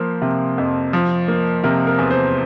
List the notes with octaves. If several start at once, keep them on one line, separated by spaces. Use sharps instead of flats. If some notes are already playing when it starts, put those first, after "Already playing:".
Already playing: F3 A#3 C5
C3
F2
F3
A#3
C3 A#4
A#4
E2
C5